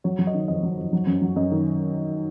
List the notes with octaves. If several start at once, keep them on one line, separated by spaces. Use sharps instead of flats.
F#3 C#5
F#3
D#5
D#3
F2 D#5
F#3
F2
F#3
F#2
F#3
F#2 D#5
D#3